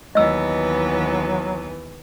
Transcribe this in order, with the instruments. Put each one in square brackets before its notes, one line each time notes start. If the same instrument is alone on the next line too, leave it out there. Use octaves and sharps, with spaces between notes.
[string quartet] D#2 E3 B3 [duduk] F#3 [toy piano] D#5 E6